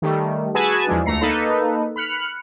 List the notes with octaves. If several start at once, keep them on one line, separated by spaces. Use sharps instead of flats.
D#3 G3 A3
F#4 G#4 B4 G#5 A5 E6
E2 F3 G#3 D4
D2 A3 A#5 C7 C#7
A#3 D#4 A4 B4
B5 F6 F#6 C#7